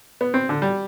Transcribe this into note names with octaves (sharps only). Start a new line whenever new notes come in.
B3
C4
D3
G3